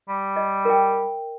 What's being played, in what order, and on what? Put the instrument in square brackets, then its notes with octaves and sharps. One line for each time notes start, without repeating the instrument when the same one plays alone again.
[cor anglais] G3
[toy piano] D#5
A#4 G5